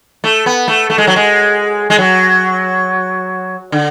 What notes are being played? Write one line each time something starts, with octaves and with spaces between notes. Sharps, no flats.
A3
B3
A3
A3
G#3
F#3
G#3
G#3
F#3
D3